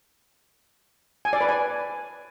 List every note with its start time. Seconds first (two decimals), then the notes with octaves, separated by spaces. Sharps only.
1.25 G#5
1.33 D5
1.41 B4
1.49 G#5